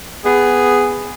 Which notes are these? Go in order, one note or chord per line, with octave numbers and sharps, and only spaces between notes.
B3 G#4